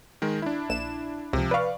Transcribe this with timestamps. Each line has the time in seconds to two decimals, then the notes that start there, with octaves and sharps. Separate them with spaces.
0.22 D#3 G#3 A#4
0.42 D4 E4
0.70 A#1 E7
1.33 C#2 C3 F3
1.51 B4 D5 F5 C#6